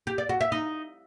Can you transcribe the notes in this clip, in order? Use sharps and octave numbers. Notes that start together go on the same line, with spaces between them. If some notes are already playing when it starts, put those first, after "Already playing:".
G4
D5
F#4
E5
D#4